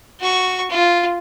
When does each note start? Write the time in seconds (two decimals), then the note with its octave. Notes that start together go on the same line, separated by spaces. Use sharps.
0.21 F#4 C#6
0.70 F4